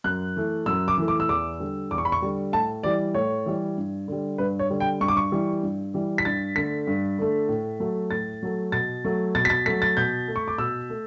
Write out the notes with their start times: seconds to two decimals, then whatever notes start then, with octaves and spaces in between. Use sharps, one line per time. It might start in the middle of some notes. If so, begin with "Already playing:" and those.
0.04 F#2 F#6
0.36 E3 A3
0.66 F#2 E6
0.88 D6
0.98 E3 A3
1.08 D6
1.20 E6
1.29 E2 D6
1.60 D3 G3
1.90 E2 D6
1.98 C#6
2.05 B5
2.12 C#6
2.22 D3 G3
2.53 A2 A5
2.83 E3 G3 D5
3.14 A2 C#5
3.46 E3 G3
3.77 G2
4.08 D3 G3
4.38 G2 B4
4.59 C#5
4.70 D3 G3
4.80 G5
5.01 G2 C#6
5.08 D6
5.17 C#6
5.32 E3 G3
5.63 G2
5.94 E3 G3
6.18 B6
6.25 G2 A6
6.56 D3 A3 B6
6.87 G2
7.19 D3 A3
7.48 A2
7.80 F#3 A3
8.11 A2 A6
8.43 F#3 A3
8.72 B2 A6
9.05 F#3 A3
9.35 B2 A6
9.45 B6
9.50 A6
9.66 A3 B6
9.69 F#3
9.82 A6
9.97 B2 G6
10.28 A3
10.36 C#6
10.48 D6
10.58 B2 E6
10.90 A3